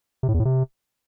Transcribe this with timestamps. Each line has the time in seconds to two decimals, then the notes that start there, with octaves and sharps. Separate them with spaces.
0.23 C3
0.29 A2
0.34 E2
0.40 A2
0.45 C3